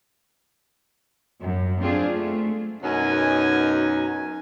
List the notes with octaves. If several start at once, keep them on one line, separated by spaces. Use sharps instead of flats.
F#2
C4 D4 F4 G#4
A3
F#2 B2 F#3 D#4 G#5